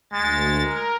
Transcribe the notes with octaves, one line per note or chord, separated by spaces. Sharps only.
D2 G#3 A6
A#4